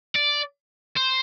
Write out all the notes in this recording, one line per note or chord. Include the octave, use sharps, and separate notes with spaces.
D5
C5